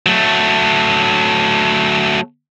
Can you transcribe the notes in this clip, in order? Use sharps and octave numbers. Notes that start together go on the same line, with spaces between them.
F#3 A3